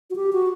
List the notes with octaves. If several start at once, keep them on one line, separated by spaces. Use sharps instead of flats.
F#4
G4
F#4